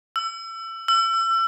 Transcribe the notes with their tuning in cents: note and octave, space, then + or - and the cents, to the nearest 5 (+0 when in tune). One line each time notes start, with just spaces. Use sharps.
E6 +25
E6 +35